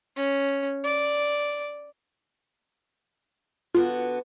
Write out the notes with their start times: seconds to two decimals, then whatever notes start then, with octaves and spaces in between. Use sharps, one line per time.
0.17 C#4
0.84 D5
3.74 D3 B3 F4 F#4